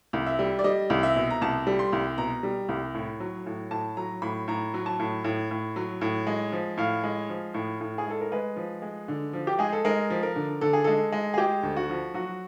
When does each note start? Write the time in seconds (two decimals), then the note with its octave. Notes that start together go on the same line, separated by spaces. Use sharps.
0.13 C2
0.26 E5
0.39 G3
0.59 D5
0.64 G3 D#5
0.90 C2
1.03 E5
1.16 B2
1.30 A#5
1.41 C2 A5
1.67 G3
1.79 C6
1.93 C2
2.18 B2 A#5
2.43 G3
2.69 C2
2.94 A2
3.20 F#3
3.46 A2
3.71 A2 A5
3.97 F#3 A#5
4.22 A2 B5
4.48 A2 A#5
4.74 F#3
4.86 A5
4.99 A2
5.24 A2
5.51 A2
5.76 F#3
6.01 A2
6.27 G#3
6.52 F3
6.77 A2 F5
7.04 G#3
7.29 F3
7.54 A2
7.81 A2
7.98 G#4
8.06 G#3 A4
8.21 A#4
8.32 G#3 B4
8.56 F3
8.82 G#3
9.08 D3
9.33 F3
9.47 G4
9.59 G#3 G#4
9.72 A4
9.85 G#3 A#4
10.10 F3
10.23 A#4
10.36 D3
10.61 D3 A4
10.73 G#4
10.84 G#3 A4
11.12 G#3
11.34 G#4
11.38 G#3 G4
11.63 D2
11.76 F#4
11.89 F3
12.14 F#3 F#4